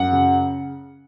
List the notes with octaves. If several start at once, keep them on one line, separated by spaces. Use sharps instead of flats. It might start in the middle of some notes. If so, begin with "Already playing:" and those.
Already playing: F#2 F#5
C#3